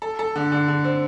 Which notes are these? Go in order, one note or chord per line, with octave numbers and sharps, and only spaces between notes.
A4
A4
D3
D3
D3
C4